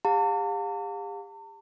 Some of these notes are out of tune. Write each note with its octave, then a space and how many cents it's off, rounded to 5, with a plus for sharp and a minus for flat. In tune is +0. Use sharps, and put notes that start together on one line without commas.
G4 +45 F5 +35 A5 +45